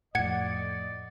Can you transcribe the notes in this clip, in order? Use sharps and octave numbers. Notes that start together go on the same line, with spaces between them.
F2 A2 D5 D#5 F#5 G#6 C#7